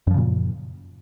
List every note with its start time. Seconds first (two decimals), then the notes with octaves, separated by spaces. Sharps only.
0.07 F#2
0.11 F3
0.14 C#3
0.18 A#2